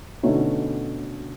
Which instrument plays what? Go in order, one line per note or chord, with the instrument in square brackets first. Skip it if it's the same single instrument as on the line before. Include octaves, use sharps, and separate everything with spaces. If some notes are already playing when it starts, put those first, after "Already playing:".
[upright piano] B2 D3 A3 B3 C#4 D#4